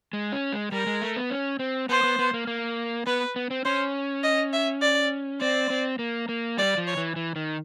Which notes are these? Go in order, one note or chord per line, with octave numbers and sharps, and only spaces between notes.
G#3
C#4
G#3
G3 A#4
G#3
A3
B3
C#4
C4
B3 C5
B3
B3
A#3
A#3
B3 B4
B3
C4
C#4 C5
D#5
E5
D5
C4 D5
C4
A#3
A#3
G3 D5
F3
C#5
E3
E3
D#3